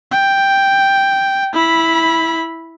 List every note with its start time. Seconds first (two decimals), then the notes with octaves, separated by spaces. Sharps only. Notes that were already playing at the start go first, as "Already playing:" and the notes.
0.11 G5
1.53 E4 B5